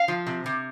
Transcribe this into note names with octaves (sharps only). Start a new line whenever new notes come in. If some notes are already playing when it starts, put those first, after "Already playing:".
Already playing: F5
F3
C3
C3